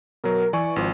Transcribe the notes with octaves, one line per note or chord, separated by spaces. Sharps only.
B2 F#3 A#4
E3 D5 G#5 C#6
G#1 F3